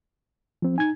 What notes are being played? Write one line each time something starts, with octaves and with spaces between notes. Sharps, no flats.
F3 C4
D#4 G#5 G#6